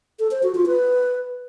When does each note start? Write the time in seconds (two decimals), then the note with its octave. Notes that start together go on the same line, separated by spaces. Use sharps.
0.19 A4
0.31 C5
0.43 F#4
0.55 F4
0.67 B4